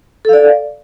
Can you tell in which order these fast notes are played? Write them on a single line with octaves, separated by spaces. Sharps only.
A4 F5 D5